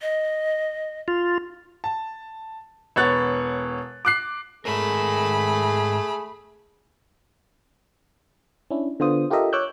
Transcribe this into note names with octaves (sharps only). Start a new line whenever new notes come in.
D#5
F4
A5
E1 B3 C#5 F#6 A6
D6 F#6 C7
G#2 A3 G#4 A#4 B5
C#4 D4 E4
D3 B3 F4 C5 D#6
F4 G4 A4 A#4 D#5 E5
C#5 D6 E6 F#6 G6